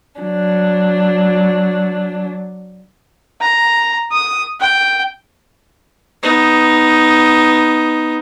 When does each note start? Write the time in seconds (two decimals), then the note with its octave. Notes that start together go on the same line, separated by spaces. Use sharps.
0.21 F#3 D4
3.41 A#5
4.11 D#6
4.60 G5
6.23 B3 D#4